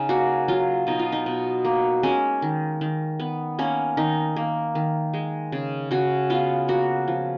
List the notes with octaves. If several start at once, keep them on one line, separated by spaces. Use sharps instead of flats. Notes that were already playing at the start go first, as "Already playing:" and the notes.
Already playing: C#3 C#4 D#4
A#3 F#4
F#3 F4
B2 D#4
F4
D#4
B2
A#3
G#3 C#4
D#3
D#3
B3
A#3 C#4
D#3 D#4
A#3
D#3
G#3
C#3
C#3 F#4
B3 F4
A#3 F#4
F3